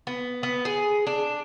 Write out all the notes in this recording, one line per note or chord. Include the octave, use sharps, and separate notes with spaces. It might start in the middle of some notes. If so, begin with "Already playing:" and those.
B3
B3
G#4
D4